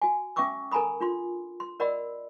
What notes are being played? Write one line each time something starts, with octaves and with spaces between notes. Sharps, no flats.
F#4 G#5
C#4 E5 G5 C#6 D6 E6
A4 A#4 G#5 A#5 B5 D#6
D4 F4 C6
C6
A#4 D5 D#5 F#5 B5 E6